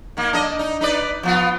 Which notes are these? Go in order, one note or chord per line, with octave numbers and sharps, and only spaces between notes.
D#3 A#3
D4 D#5
D#4
D#4 B4 D5
F3 B3 F4